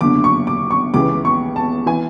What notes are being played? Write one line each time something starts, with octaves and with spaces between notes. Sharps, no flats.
F#1 E2 D3 D6
C#6
D6
C#6
C#2 C#3 E3 D6
C#6
A5
E3 G#5